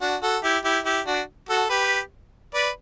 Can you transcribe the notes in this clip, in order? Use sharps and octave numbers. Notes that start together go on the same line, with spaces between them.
D4 F#4
F#4 A4
E4 G4
E4 G4
E4 G4
D4 F#4
F#4 A4
G4 B4
B4 D5